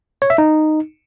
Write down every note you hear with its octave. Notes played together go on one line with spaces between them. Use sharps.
C#5
E5
D#4